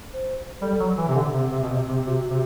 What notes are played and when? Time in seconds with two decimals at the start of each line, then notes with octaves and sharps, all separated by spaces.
0.13 C5
0.61 G3 A4
0.80 F#3
0.98 E3
1.08 C3
1.16 D3
1.34 C3 C4
1.51 C3
1.62 B2
1.70 C3
1.89 C3
2.06 C3 F#4
2.30 C3